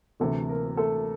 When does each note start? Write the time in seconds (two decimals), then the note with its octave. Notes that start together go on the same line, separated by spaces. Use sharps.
0.20 D2 C3 E3 A3 A4
0.49 A#3 A#4
0.77 A3 A4